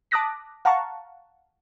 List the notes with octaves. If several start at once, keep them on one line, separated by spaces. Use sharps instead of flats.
A5 D6 D#6 F#6 A#6 B6
F5 F#5 A5 A#5 C#6